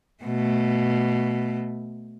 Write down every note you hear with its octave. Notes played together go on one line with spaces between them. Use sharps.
B2 A3